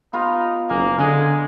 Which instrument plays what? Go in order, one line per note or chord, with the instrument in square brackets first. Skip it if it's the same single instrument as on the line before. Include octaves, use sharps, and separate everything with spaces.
[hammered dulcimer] B3 F4 G4 [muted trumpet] D#4
[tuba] F#1 [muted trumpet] A#3 [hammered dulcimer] G#5
[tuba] D3 [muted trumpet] G#3 [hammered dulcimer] G#5 D6